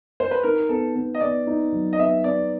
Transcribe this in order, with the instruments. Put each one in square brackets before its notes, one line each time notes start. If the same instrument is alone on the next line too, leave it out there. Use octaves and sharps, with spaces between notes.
[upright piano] C5
B4
[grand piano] D#4 [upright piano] A#4
[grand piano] B3 [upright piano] A4
[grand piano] B3
[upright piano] D#5
[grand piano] B3 [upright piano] D5
[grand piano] D#4
F#3
[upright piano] D#5
[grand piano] B3 [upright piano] E5
[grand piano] B3 [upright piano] D5